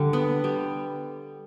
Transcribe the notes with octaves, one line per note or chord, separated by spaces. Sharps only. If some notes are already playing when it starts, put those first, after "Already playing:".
Already playing: D3 G3
B3
G3